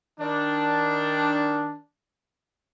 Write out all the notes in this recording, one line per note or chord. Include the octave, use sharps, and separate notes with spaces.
D#3 D4